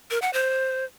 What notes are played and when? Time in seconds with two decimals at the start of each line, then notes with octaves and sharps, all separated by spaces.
0.11 A#4
0.22 F#5
0.33 C5